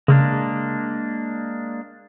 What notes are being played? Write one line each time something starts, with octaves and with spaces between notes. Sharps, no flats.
C#3 G#3 A#3 D4